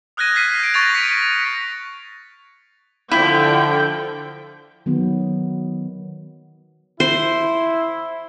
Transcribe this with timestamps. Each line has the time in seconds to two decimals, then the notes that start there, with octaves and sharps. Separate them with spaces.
0.17 D#6 F6 F#6 G#6 A#6 D#7
0.34 F#6 G#6 B6 C7 D#7
0.59 G6 D7
0.74 C#6 A6 A#6 F7
0.94 B6 C#7 F7
3.11 D3 F3 E4 G5
4.86 D#3 F#3 B3
7.00 E4 C5